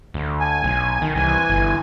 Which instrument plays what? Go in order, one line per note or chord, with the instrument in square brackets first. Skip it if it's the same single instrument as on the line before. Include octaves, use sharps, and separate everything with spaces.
[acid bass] D2
[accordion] G#5
[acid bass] B1
D#3
[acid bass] C2 [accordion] E3 G#5
[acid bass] G1